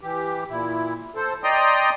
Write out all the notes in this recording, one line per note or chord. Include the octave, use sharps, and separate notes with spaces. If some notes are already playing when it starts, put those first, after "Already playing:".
E3 G4
A#2 E4
A4 C5
D5 D#5 G5 A#5 C6 D#6